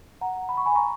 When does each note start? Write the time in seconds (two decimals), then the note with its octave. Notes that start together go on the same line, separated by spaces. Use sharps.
0.21 F#5 A#5
0.49 B5
0.57 C#6
0.66 G#5 B5
0.76 A#5 C#6